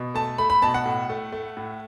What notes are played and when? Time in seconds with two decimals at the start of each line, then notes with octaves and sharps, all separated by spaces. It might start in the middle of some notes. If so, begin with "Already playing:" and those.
Already playing: B2
0.14 A3 A5
0.38 A3 B5
0.50 B5
0.62 B2 A5
0.74 F#5
0.85 A2
1.09 A3
1.32 A3
1.57 A2